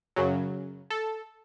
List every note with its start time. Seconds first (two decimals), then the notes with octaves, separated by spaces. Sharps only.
0.16 F#2 C#3 F#3
0.90 A4